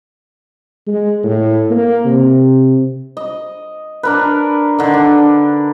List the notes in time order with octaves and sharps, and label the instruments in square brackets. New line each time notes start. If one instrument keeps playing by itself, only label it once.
[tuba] G#3
A2
A#3
C3
[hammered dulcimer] D#5
D4 A#4 B4
D3 D#3
D4